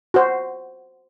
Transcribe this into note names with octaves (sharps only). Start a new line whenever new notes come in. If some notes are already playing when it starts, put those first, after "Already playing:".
F#4 C5